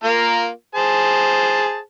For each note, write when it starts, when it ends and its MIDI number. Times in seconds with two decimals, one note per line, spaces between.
0.04 0.48 58
0.04 0.48 65
0.04 0.48 70
0.75 1.78 68
0.75 1.78 72
0.75 1.78 81